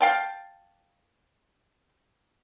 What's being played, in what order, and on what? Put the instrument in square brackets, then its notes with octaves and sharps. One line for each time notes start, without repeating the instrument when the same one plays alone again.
[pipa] F5 G5 A5